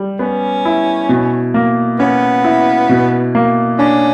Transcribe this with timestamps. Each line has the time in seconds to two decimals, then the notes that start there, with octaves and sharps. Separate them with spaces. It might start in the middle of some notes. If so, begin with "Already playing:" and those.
Already playing: G3
0.19 B3 C#4
0.65 E4
1.09 B2
1.54 A#3
1.99 B3 C#4
2.44 E4
2.89 B2
3.35 A#3
3.78 C#4 D4